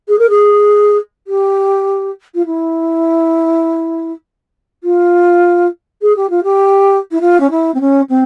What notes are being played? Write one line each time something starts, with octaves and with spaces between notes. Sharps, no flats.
G#4
A#4
G#4
G4
F4
E4
F4
G#4
G4
F4
G4
E4
F4
C#4
E4
C4
C#4
C4